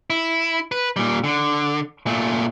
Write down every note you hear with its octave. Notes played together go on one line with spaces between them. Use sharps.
E4
B4
A#2 G3
D3
A#2 A3